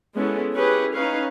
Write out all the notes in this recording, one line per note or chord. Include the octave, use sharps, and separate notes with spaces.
G#3 B3 C#4 E4 A4
C#4 E4 G4 G#4 B4
C#4 D#4 B4 C#5 F5